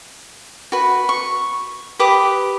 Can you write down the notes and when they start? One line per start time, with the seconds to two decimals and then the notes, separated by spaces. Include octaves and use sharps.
0.72 F#4 B4
1.09 C#6
1.99 G4 B4 D6 D#6